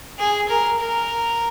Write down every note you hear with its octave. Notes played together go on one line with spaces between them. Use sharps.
G#4
A#4
A#4